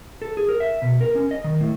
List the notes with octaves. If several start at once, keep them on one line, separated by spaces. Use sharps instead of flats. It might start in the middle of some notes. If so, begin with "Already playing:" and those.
A4
G#4
A#4
E5
B2
A#4
C#4
D#5
D#3
A2